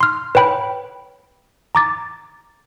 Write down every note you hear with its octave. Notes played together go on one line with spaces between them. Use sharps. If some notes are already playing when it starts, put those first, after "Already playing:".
C6 F6
B4 C#5 G5 B5
A#5 D6 A6